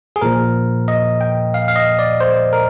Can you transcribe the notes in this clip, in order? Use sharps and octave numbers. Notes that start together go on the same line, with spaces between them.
G#4
A#2 F3 A#4
D#5
G5
F5
F5
D#5
D5
C5
A#4